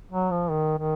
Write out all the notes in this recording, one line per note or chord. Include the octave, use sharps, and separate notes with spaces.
F#3
F3
D#3
D#3